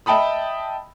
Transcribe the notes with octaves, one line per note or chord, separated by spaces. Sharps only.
D#5 E5 G5 A5 B5 D#6